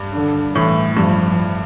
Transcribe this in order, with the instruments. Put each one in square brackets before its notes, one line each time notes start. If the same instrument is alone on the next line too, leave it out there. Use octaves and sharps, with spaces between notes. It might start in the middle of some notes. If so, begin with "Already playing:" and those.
Already playing: [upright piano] G2
[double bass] D3
[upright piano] A2 [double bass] E3
[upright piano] G2 [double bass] F3